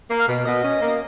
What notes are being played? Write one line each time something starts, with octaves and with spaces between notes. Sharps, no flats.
A#3
F5
B2
B2 D#5
C#4
A#3